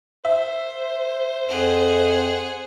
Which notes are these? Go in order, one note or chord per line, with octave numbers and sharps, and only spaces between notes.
C5 E5
F2 G#4 F#5